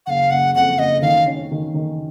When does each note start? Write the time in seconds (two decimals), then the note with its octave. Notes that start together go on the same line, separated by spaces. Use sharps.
0.06 F#1 F5 F#5
0.31 F#1 F#5
0.55 F2 F#5
0.78 F#1 D#5
1.02 D#3 F5
1.26 C#4
1.51 D#3
1.74 D#3